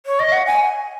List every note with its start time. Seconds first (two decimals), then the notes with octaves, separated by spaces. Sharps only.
0.06 C#5
0.19 D#5
0.32 F#5
0.46 G#5